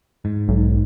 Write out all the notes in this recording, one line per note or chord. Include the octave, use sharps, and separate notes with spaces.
G#2
B1